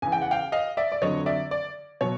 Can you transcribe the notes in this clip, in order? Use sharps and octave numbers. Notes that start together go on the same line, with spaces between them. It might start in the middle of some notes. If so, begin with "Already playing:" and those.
E2 C#3 E3 G#5
G5
F#5
F5 G5
D#5 F5
D5 E5
D5
F2 D3 F#3 C#5 D#5
D5 E5
D5
B2 F#3 C#5